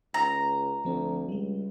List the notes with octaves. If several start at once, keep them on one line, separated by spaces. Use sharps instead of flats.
C#2 A#5
D2 F3 C4
C#2 G3 G#3